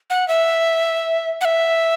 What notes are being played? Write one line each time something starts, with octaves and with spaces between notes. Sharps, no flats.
F#5
E5
F#5
E5